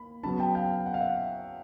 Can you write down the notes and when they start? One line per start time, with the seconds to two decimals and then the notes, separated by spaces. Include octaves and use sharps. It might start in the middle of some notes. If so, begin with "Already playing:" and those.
Already playing: A#3 B5
0.23 C#3 F#3 B3 A5 B5
0.40 G5 A5
0.55 F5 G5
0.86 F#5
0.94 F5
1.01 E5 F#5